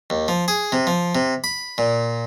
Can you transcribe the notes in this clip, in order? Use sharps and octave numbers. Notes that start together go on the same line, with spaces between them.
D#2
F3
G#4
C3
F3
C3
B5
A#2